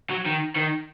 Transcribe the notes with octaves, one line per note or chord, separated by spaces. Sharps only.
F#3
D#3
D#3